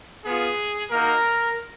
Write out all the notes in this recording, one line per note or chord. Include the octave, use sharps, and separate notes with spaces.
B3 F4 G#4
A#3 D#4 F#4 A#4